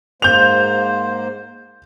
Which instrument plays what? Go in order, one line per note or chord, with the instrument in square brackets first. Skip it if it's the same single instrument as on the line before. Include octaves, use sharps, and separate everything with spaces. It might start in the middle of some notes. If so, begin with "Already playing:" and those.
[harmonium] G#2 A#3 C5 [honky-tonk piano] G6 F7